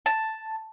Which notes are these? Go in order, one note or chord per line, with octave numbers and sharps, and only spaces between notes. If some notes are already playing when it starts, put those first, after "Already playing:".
A5